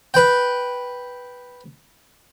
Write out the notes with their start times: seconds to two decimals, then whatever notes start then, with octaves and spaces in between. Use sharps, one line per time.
0.14 B4 G5